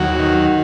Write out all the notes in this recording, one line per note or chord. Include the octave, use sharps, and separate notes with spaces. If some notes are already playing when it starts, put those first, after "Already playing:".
Already playing: D#2 F#3 F#4
D#3